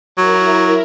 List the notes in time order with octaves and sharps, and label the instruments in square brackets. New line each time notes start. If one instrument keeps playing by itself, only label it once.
[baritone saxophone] F#3 [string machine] E4 A#4